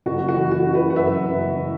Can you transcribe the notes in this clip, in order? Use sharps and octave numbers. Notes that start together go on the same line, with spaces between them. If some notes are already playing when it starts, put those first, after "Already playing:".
F#1 F#4
F#4
E3
F#4
C#3
F#4 B4
F#5
F#2 B4 E5
F#1
E3